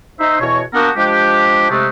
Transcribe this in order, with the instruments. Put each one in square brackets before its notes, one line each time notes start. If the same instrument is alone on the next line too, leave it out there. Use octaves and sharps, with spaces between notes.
[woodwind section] D#4 C5 E5
E2 B2 F#4 C#5
A#3 B3 D4 F#4 G4 A#4
F3 G#3 D4 G4
C3 G#3 A3